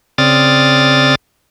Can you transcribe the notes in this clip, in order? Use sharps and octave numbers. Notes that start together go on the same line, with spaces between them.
C#3 C4 D5 D#6 F6 A6